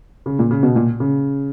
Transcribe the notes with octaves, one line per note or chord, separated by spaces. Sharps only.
C#3
A#2
C#3
B2
A#2
C#3